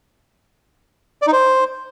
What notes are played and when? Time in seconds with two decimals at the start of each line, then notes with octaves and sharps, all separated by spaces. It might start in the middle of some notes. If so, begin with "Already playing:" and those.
1.22 D5
1.27 D#4
1.32 C5